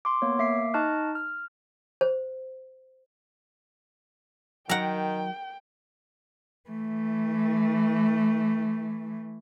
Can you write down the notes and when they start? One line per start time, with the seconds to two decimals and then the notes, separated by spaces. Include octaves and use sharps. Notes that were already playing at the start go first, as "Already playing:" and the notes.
0.05 C6 D6
0.22 A#3 B3 C#5
0.39 A#3 E5 D6 C7
0.74 D#4 D#5 A5 C#6 F6 F#6
1.15 F6
2.01 C5
4.69 D#3 F#3 A#4 F#5 G5
6.70 E3 A3